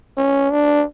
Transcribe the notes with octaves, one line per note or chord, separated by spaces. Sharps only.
C#4
D4